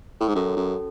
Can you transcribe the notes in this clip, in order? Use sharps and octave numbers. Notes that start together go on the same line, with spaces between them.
A2
G#2
F#2 C#4 F#4 A4
F#2